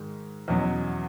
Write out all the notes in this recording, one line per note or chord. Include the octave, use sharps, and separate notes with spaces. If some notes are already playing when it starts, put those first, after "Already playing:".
Already playing: G#2 D#3 G#3
E2 B2 F#3 C#4